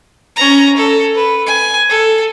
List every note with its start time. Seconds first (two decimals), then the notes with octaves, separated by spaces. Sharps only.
0.36 C#4 A#5
0.76 A4
1.15 B4
1.46 G#5
1.89 A4